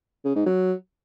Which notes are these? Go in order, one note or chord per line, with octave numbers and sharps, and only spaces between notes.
C#3
G#2
F#3